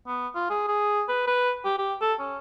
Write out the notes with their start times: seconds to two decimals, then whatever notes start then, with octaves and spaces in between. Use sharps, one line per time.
0.07 B3
0.35 F4
0.50 G#4
0.68 G#4
1.09 B4
1.27 B4
1.65 G4
1.79 G4
2.01 A4
2.19 C#4